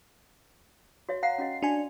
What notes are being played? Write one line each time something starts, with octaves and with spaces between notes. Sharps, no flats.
F#4 C#5 E5
F5 F#5 A#5 C7
C#4 F#4 D#5
D4 F#4 G#5